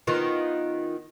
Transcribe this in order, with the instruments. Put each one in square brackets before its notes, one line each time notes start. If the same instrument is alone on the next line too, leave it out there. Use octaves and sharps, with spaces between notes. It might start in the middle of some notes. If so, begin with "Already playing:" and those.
[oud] D#3 B3 F4